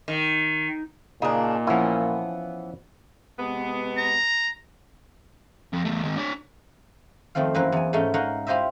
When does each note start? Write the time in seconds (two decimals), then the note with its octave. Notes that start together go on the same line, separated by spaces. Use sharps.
0.08 D#3
1.22 A#2 C#3 A#3 D4 D#4
1.67 E3 F3 B3 C#4 E4
3.38 C3 G#3 B3
3.98 A#5
5.73 F2
5.85 E2 A2
6.04 G#2 D#3
6.16 D4 C#5
7.35 F2 D#3 A3 C4 F5
7.54 F#2 E3 A#3 C4 B4
7.72 E2 G#5
7.93 G#2 G#3 A3 C#4 D#4
8.14 D#4 A#4 C#5 F5 F#5
8.47 E4 F4 G4 C5 D#5 E5